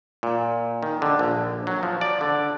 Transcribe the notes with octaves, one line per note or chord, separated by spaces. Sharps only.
A#2
D#3
D3
A#1
F#3
F3
D5
D3